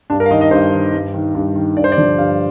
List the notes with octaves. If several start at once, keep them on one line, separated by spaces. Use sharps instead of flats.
G2 D4
A#4
F5
D#3 D#5
D#5
G2 C5
D#3
G2
D#3
G2
D#3
G2 D5
C5
D5
D3 F3
G2 F5